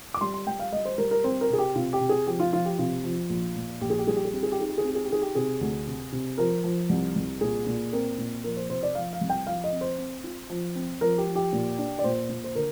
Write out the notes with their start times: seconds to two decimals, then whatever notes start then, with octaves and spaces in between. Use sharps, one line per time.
0.14 D6
0.21 G3 C6
0.34 C6
0.47 G3 G5
0.59 F5
0.73 G3 D#5
0.85 C5
0.98 G3 A#4
1.11 A#4
1.24 C4 C5
1.41 A#4
1.50 C3 G#4
1.58 G4
1.75 C3 F4
1.93 G4
2.01 C3
2.09 G#4
2.26 F3 G4
2.40 F4
2.52 F3 F4
2.65 G4
2.78 C3 F4
3.04 F3
3.30 A#1
3.56 A#2
3.81 A#1 G4
3.90 G#4
3.98 G4
4.07 G3 G#4
4.16 G4
4.25 G#4
4.33 C4 G4
4.43 G#4
4.52 G4
4.58 D#4 G#4
4.69 G4
4.78 G#4
4.84 C4 G4
4.95 G#4
5.04 G4
5.10 D#4 G#4
5.22 G4
5.35 C3 G#4
5.61 D2
5.87 C3
6.12 C3
6.38 F3 A#4
6.64 F3
6.89 C2
7.16 C2
7.41 A#2 G#4
7.67 A#2
7.93 C4 A#4
8.18 A#2
8.44 F3 A#4
8.57 C5
8.70 C3 C5
8.83 D5
8.95 F3 F5
9.13 F5
9.21 C2
9.29 G5
9.47 F3 F5
9.64 D#5
9.72 C4
9.81 C5
9.98 C4
10.24 F4
10.50 F3
10.75 C4
11.01 F3 A#4
11.18 G4
11.27 F3
11.36 G4
11.53 A#2
11.78 D4
11.99 D5
12.04 A#2 C5
12.29 A#2
12.44 C5
12.55 D3 A#4